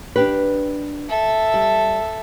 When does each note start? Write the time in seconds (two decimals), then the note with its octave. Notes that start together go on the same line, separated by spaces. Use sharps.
0.16 D4 G4 B4
1.09 A4 E5
1.54 G3